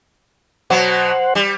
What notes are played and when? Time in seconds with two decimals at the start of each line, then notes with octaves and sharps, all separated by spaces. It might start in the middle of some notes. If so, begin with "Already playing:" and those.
0.70 B2 F#3 C5 F#5
1.35 G3